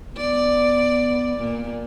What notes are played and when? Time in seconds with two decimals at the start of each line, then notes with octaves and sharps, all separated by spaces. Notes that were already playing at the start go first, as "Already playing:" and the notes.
0.15 B3 D5
1.37 A#2